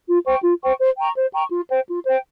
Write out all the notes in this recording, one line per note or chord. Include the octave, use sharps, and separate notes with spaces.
F4
C5 G5 C#6
F4
C5 G5 C#6
C5
G5 A#5 C#6
C5
G5 A#5 C#6
F4
C5 G5
F4
C5 G5